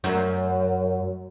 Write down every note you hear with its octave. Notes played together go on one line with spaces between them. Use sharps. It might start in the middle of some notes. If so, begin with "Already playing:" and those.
F#2